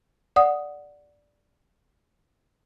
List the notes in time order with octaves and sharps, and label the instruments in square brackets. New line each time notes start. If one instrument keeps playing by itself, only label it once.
[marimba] D5 F#5 D#6